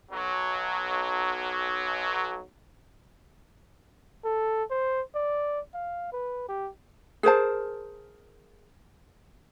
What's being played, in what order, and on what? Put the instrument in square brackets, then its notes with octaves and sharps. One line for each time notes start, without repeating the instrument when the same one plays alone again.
[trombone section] B1 F#3
[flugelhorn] A4
C5
D5
F5
B4
G4
[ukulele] G#4 A#4 C5 A5